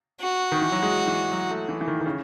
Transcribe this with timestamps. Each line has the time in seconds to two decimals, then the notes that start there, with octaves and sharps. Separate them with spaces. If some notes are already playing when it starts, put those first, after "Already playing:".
0.21 F#4
0.52 D#3
0.62 E3
0.72 F#3
0.83 G#3
1.07 E3
1.32 F#3
1.51 A3
1.69 E3
1.81 E3
1.88 D#3
2.01 D#3
2.06 C#3